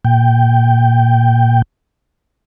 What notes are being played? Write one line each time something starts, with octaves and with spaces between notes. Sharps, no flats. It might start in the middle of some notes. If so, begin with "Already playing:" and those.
A#2 G5